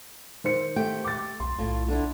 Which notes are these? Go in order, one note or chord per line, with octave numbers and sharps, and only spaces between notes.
D#3 C5 C#7
A3 G4 G5
D6 A6
B1 C6
B1 A2 F4
D3 D4 E4